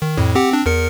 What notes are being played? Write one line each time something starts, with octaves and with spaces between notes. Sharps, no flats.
D#3
F2 A2
C4 G4 F#5
C4 D4
E2 A#4 C#7